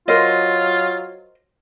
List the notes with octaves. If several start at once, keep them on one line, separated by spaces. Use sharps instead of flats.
F#3 F4 A#4 C5 D#5